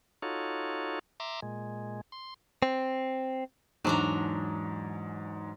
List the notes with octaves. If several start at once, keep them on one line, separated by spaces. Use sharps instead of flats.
D#4 F4 F#4 A4 C#5
E5 A#5 C6 D6
A#2 G#3
C6
C4
E2 G#2 F#3 G#3 D4 A#5